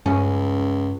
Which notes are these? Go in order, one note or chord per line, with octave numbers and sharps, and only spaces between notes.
C#2 G2 C#4